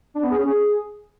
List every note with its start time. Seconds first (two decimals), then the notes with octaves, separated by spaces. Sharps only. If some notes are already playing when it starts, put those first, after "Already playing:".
0.15 D4
0.23 B3
0.31 G#4
0.39 C#4
0.46 G#4